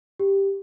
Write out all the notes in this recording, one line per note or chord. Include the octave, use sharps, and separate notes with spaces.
G4